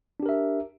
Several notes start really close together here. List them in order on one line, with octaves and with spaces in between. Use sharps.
D4 G4 A#4 E5